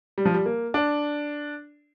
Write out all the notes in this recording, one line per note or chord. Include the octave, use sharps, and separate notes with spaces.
G3
F3
G3
A#3
D4